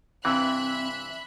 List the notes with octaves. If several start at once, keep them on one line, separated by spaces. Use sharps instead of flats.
G2 C3 E3 C4 E5 B5 F#6